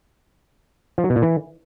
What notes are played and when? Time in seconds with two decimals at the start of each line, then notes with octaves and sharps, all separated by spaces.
0.98 F3
1.04 F#3
1.10 B2
1.16 A#2
1.22 E3